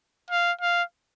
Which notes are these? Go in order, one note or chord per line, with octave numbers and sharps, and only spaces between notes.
F5
F5